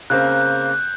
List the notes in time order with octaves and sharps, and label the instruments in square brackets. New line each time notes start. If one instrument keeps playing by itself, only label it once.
[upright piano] C#3 A#3 C4 [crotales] F#6 G6